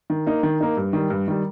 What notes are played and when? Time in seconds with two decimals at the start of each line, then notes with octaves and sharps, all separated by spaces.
0.10 D#3
0.26 A#3 D#4
0.43 D#3
0.60 A#3 D#4
0.77 G2
0.93 D#3 G3
1.10 G2
1.28 D#3 G3